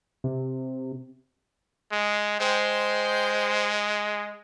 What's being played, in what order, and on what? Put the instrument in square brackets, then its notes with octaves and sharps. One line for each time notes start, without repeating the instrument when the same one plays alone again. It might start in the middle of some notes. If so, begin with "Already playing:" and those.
[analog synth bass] C3
[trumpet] G#3
[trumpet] G#3 [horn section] C5 G5